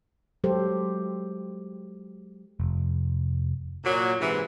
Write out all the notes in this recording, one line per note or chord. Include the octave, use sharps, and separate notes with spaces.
F#3 G#3 G4 A4 C5
F1
A#2 F#3
G#2 C3 E3